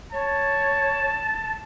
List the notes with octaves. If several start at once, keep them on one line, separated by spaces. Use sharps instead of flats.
C#5 A5